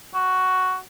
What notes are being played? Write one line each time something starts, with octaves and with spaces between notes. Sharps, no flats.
F#4